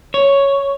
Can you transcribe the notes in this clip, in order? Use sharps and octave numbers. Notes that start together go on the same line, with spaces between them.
C#5